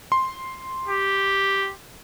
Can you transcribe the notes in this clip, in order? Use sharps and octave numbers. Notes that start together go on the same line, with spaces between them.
C6
G4